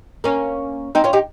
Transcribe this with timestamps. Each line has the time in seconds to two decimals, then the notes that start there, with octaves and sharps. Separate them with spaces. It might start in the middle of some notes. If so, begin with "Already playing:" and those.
0.24 A#3 C#4
0.95 C4 D#4
1.04 C#4 F4
1.13 D#4 G4